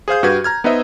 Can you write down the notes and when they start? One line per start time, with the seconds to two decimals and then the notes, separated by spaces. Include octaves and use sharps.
0.08 G#4 C5 F5 G6
0.23 G2 F#4 G4 B4 G#6
0.44 A#5 F6 G#6
0.64 B3 D#4 B4 C5 D#5 E5